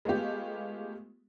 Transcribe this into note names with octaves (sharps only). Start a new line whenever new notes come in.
G#3 A3 B3 F4 G4